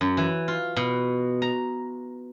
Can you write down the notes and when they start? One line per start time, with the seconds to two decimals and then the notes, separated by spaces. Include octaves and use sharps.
0.01 F#2
0.17 E3
0.48 F4
0.76 B2
1.42 A#5